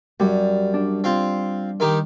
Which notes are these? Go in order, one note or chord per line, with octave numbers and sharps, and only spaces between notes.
F#2 G3
D4
C4 F4
D#3 D#4 G4